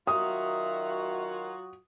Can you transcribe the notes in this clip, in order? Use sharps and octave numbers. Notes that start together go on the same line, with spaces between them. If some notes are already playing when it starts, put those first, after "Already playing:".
D#3 F#3 F4 F#4 E5 D#6